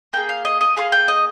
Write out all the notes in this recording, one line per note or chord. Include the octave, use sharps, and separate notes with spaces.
A#3 F4 G#4 G5
F5
D#5
D#5
A#3 F4 G#4 F5
G5
D#5